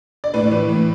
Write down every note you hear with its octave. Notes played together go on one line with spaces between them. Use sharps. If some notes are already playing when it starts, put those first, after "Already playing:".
D5
A2 B4
E3
A2